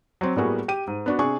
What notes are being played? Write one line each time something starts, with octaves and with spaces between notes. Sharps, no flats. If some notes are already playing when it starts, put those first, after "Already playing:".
F#3 C4
A2 G3 A#3 B3 F#4 G#4
G4 D#7
G#2
B3 D4 F#4
C3 D4 G#4 G#5 C#6